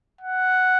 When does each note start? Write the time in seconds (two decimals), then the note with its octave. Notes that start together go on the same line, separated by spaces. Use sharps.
0.21 F#5